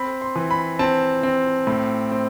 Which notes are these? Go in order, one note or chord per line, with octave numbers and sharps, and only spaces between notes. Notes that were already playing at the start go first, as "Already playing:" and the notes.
Already playing: C4 B5
C6
E3
B5
C4 A5
C4
A2
C4